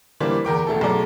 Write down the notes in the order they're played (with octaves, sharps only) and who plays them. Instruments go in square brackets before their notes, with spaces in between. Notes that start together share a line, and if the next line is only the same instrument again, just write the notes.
[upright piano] E3 G3 A#3 D4 C5
E2 A#4 G5 D6
E1 A3 A4
B1 C#3 A3 A4 D5 A#5